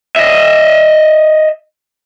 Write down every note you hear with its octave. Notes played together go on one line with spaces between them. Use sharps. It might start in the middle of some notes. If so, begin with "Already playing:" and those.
D#5 E5